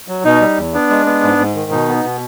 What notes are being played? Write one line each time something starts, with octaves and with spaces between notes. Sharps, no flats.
F#3
B2 D#4
G3
E2
B3 D4
G#3
B3
G#2
G#2
D#3
B2 D#4
B3
B2